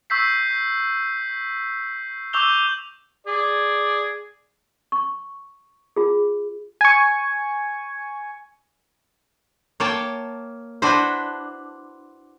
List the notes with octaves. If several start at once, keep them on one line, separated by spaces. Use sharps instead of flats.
C#6 E6 G6 B6 C7
C#6 D6 E6 G6 F7 G7
G#4 D5
C#6
F4 G#4
G#5 C#6
A#3 C#5 G5 A5
D4 E4 F#4 B4 C5